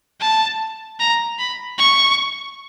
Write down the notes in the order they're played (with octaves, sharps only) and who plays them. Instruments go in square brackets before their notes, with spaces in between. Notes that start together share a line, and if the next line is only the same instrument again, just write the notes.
[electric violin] A5
A#5
B5
C#6